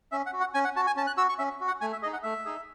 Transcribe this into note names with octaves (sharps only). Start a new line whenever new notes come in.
C#4 E5
F#5
F#4
F#5
C#4 G#5
F#5
F#4 A5
G#5
C#4 A5
F#6
F#4 E6
C#6
C#4 E5
F#4
F#5
A3 G#5
E5
D#4 G#4 D#5
F#5
A3 E5
D#4 G#4